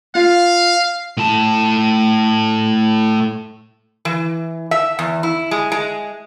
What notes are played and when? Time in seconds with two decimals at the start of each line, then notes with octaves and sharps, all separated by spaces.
0.15 F4 F5
1.17 A2 A5
4.05 E3
4.71 E5
4.99 E2
5.23 E4
5.51 G#3
5.72 G#3